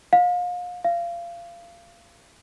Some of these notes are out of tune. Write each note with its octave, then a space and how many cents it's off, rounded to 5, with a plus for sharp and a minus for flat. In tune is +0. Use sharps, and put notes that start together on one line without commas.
F5 +35
F5 -25